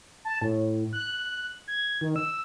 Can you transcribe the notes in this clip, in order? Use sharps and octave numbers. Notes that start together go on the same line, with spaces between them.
A5
A2
F#6
G#6
D#3
E6